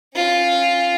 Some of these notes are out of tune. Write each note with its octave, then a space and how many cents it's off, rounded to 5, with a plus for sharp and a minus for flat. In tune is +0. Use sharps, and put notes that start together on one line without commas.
C#4 -30 F4 +0